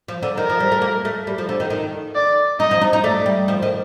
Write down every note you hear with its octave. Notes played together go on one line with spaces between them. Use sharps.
F3
D3
D#3 A#4
F3
G3
A3
A#3
A3
G3
F3
D3
D#3
D#3
D5
D#4 D#5
F3
D#4
D#4
A3 D5
G3
F3
D#3